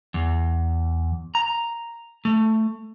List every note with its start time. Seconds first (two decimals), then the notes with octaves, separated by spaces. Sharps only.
0.14 E2
1.35 A#5
2.25 A3